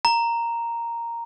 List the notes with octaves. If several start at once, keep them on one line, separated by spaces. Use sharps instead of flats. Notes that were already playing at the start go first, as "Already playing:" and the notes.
A#5